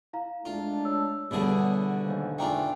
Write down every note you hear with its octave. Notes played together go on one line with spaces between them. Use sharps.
E4 F5 A#5
G#3 A3 D4 F4
C#5 E6
E2 G2 B2 D3 F#3 G3 B3 G#4
D#2 G#2
E2 G#2 A3 D4 F4 G5 G#5 A#5